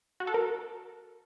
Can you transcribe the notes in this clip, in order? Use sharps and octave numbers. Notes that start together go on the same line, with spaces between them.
F#4
A4
A#4